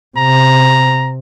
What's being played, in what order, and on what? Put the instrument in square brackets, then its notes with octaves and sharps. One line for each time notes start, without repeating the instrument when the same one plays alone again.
[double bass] C3 [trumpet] A#5